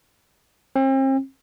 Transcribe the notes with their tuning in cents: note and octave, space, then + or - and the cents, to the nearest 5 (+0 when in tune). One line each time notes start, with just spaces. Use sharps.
C4 +40